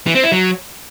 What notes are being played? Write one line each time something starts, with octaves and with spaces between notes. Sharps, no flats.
E3
C4
E4
F#3